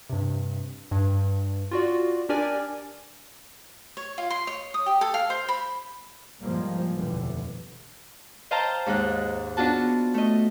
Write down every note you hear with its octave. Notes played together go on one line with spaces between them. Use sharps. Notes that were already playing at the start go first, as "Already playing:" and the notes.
G2 C3
G2
F4 F#4 D5
D4 G4 A#4 D5 G#5
C#5
F4
C6
C#5
D#6
G4
A4
F5
C5
B5
G#2 F3 G3 G#3 A#3
F1 D#2 B2 D3 E3 G3
C5 D#5 F5 G5 A5 A#5
D#2 G#2 G#3 F#6
B3 D4 F4 F#4 A5
A3 D#5